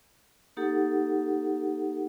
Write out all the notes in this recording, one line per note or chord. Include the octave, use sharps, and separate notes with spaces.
A#3 D#4 G4 A4 F#5